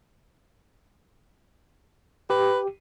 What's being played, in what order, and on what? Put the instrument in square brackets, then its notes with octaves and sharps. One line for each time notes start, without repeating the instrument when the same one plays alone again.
[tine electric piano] G4 [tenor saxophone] B4